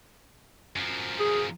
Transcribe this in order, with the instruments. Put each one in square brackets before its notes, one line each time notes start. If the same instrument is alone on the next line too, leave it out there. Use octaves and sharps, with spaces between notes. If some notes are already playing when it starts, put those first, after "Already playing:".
[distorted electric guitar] F#2 F3
[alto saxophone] G#4